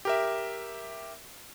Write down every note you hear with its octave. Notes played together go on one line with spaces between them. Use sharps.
G4 A#4 E5